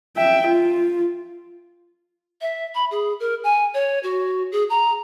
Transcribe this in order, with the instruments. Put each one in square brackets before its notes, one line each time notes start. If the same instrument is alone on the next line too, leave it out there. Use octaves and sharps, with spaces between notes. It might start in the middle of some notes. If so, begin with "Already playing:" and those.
[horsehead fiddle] E5 G5
F4
[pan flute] E5
B5
G#4
A#4
G#5
C#5
F#4
G#4
A#5